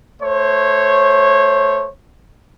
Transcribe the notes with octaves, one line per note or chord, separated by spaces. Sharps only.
A3 C5 C#5